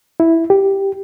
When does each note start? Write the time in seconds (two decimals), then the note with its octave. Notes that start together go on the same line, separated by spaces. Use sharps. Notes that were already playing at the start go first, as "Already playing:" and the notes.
0.20 E4
0.50 G4